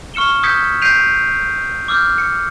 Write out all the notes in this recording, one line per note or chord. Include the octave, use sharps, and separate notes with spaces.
C#6 F6 C#7 E7 G7
D#6 E6 G6 G#6 B6 C#7
G6 B6 C7 D7 D#7 F7
D6 E6 F6 G6
C#7